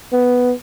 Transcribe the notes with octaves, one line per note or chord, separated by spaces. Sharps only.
B3